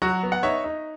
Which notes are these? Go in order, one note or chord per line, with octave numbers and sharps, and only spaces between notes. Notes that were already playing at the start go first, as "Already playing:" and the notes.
F#3 F#4
B3
F#5
D#4 C#5 E5
D#4